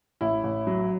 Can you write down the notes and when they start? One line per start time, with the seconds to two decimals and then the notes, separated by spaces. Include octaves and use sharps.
0.21 A1 E4
0.44 A1
0.67 F#3